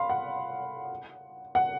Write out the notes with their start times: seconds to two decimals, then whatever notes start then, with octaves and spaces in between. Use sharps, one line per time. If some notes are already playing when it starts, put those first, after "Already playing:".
Already playing: F5 B5 C6
0.10 F#5
1.55 F#5